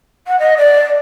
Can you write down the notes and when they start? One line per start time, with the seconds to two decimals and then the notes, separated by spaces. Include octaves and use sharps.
0.27 F#5
0.39 D#5
0.57 D5